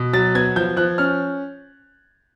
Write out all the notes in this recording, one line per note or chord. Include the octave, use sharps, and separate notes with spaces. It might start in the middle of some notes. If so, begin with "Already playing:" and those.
Already playing: B2
F#3 A6
B3 G#6
F3 G6
F3 F#6
C#4 F6